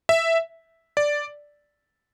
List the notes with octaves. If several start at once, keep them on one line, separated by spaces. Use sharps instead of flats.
E5
D5